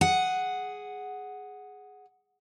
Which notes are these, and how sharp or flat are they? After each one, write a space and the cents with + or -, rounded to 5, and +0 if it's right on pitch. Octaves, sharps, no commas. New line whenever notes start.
G#4 +0 F#5 +0